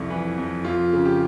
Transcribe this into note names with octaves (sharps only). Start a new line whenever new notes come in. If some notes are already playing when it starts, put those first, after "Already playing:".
Already playing: C2 F2 E4
E3
F2
F2 F4
C#3
G4